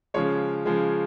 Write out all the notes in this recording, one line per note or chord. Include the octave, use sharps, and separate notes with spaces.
C#3 F3 G#3 C#5
C#3 F3 G#3